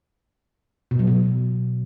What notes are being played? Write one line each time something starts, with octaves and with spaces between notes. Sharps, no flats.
B2
F#3
B2